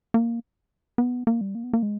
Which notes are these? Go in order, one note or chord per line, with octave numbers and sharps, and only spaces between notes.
A#3
B3
A#3
G3
A#3
B3
A#3
G#3